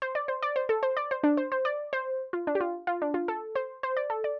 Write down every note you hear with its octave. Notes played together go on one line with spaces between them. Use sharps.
C5
D5
C5
D5
C5
A4
C5
D5
C5
D4
C5
C5
D5
C5
F4
D4
G4
F4
F4
D4
F4
A4
C5
C5
D5
A4
D5